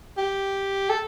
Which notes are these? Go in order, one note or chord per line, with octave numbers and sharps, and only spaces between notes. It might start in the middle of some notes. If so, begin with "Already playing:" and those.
G4
A4